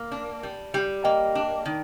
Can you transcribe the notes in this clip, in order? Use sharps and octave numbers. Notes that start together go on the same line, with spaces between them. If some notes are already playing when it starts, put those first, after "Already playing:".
Already playing: A#3
D4
G3
G3
A#3 D#5 G5
D4
D#3